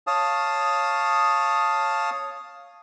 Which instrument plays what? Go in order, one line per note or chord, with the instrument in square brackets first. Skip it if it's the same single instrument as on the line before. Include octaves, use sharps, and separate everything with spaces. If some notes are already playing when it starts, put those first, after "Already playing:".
[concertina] C#5 F5 A5 D#6